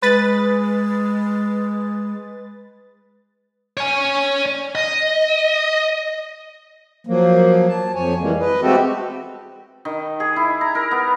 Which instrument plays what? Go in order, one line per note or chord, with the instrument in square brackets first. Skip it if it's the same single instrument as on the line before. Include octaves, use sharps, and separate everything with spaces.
[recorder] G#3 [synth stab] B4 A6
[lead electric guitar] C#5 G#5
D#5
[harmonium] F3 F#3 A#3
A5
F2 F3 C#5 G#5
E3 G3 G#3 A#3
B4 D#5
G#3 A3 C4 F#4 G4 A4
[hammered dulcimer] D#3
G#4
E4
A#5
A#4
B3